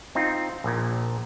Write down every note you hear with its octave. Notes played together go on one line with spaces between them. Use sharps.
C4 D#4 F4
A#1 A#2